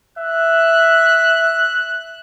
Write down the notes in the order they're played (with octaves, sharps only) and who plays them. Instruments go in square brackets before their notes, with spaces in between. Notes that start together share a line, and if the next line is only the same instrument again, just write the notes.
[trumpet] E5 [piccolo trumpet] F#6